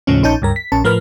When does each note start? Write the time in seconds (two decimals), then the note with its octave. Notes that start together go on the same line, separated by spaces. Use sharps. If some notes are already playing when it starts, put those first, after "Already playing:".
0.07 D#2 A2 C#3 F3 C#4
0.23 A#1 C#4 D#4 A5 G6
0.42 C#2 G2 A#4
0.56 B6
0.72 A#1 C#4 A5
0.84 A2 F3 A#4 B4 F6